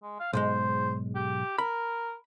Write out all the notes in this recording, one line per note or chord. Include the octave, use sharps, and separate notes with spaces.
G#3
F5
B1 G#2 G#3 C5
G4
A#4 B5